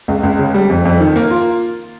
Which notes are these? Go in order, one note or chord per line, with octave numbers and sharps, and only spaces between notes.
C#2
C#2
C#3
G3
F2
F2
D#3
A#3
F4